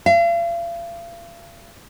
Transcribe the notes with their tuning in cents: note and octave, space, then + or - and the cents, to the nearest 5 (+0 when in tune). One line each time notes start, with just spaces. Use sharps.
F5 -40